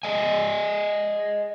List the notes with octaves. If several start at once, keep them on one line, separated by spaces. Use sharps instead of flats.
G#4 D5 D#5 G#5